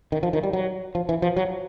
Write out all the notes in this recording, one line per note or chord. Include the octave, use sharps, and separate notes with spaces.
D#3
F3
D#3
G3
F#3
F3
E3
F3
F#3